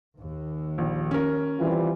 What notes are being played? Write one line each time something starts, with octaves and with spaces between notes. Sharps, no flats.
D#2
A#1
C#4 A#4
C3 E3 G3 F4